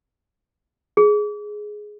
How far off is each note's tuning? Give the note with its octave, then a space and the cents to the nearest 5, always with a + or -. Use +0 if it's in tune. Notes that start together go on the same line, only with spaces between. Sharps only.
G#4 +10